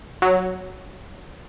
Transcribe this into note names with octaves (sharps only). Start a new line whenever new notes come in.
F#3